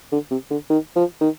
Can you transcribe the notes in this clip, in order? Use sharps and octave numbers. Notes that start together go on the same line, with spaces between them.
D3
C3
D3
D#3
F3
D#3